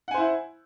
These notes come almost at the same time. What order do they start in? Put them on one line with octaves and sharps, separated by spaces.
F#5 G#5 C5 E4